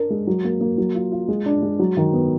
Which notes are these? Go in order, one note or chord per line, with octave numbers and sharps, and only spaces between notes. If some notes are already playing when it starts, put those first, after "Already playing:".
Already playing: D4 A#4
G#3
F#3
A#3
A#3
F#3
F4
F4
G#3
D4
G#3
F#3
D#3
B3